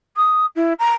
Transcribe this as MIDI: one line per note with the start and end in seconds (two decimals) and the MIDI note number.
0.17 0.46 87
0.56 0.73 64
0.79 0.90 82